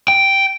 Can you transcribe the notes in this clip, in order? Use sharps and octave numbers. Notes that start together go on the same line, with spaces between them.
G5